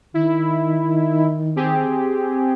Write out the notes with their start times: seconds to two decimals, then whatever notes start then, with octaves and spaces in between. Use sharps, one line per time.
0.14 D#3 E4
1.56 C4 G4 G#4